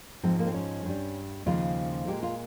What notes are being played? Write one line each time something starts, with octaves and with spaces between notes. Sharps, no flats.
G#2 F3 G#3 C4
A#3
C4
C#4
G2 G3
D#2 C#3 F3 G#3 F4
A#2 G#3 G4
F4